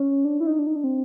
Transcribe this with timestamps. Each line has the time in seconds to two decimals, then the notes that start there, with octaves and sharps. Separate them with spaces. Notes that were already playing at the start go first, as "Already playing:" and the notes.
Already playing: C#4
0.25 D4
0.40 E4
0.47 D#4
0.59 D4
0.67 D#4
0.76 D4
0.84 C4